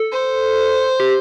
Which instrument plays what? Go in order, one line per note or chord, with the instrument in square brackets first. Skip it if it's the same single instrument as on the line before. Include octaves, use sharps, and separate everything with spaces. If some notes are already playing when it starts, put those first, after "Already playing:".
Already playing: [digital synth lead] A4
[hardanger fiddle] C5
[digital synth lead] G4